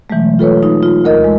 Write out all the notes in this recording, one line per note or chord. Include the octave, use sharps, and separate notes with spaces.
B2 E3 F#3 G#3 A3
F4 A4 B4 C#5
D#4 F4
F4
D2 A#4 D#5
D2 G#3